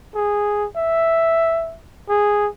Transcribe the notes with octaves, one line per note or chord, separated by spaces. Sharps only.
G#4
E5
G#4